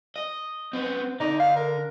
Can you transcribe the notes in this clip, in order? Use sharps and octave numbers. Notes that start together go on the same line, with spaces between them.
D#5
B3 C4
D3 D#4 D5
F5
A#4